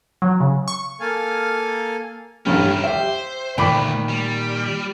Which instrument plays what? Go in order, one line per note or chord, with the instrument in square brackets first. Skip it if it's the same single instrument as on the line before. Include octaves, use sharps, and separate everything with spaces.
[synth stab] F#3
C#3
C#6
[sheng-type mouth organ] A#3 A4 F5 G#5
[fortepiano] A1 G2 G3 [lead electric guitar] D#3 C#4
[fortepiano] G4 E5 [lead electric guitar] C5
[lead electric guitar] D2 [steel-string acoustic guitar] A#2 D#3 [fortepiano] G5 B5 D6
[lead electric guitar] G3